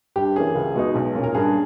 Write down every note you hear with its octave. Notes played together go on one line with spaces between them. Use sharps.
G2 G4
E3 A#3 C#4 G#4
C#2
B2 G#3 B3 D#4
B1
A#2 A#3 C#4
A#4
G2 G#4